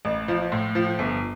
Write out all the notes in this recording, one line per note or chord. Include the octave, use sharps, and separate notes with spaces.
A1
F3
A2
F3
G1